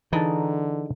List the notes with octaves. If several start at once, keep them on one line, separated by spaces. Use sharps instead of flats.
D3 E3 D#4 G#4 A5